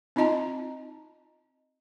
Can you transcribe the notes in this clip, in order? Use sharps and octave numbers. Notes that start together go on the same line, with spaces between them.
C4 D#4 F4 D#5 A5 A#5